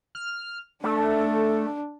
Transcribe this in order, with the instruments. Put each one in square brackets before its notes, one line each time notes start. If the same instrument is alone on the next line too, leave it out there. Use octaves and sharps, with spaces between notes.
[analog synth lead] F6
[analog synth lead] A3 [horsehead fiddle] D4 [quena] A4